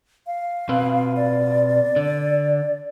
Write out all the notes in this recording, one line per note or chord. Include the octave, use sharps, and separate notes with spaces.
F5
B2 C4 B4
D5
D3